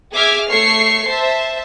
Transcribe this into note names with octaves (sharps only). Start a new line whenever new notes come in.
G#4 E5 D6 F6 G#6
A3 C#5 C#6 C7
C5 E5 A5